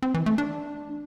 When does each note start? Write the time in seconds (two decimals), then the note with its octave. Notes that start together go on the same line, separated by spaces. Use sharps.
0.02 C4
0.14 E3
0.26 A3
0.38 D4